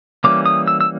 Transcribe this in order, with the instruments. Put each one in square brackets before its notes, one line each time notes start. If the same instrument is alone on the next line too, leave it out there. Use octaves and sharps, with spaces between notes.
[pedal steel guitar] E3 G3 A#3 C#4 D6
D#6
E6
E6